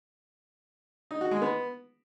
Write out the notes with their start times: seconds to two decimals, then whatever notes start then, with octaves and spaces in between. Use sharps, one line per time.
1.11 D#4
1.21 F#4
1.31 G#3
1.42 B3